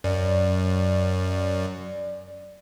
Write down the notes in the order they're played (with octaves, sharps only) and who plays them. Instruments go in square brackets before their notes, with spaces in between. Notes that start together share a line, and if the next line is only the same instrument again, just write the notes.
[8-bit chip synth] F#2 [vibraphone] D5